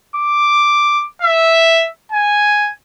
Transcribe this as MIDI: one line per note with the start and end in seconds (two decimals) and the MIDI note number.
0.16 1.04 86
1.22 1.87 76
2.12 2.71 80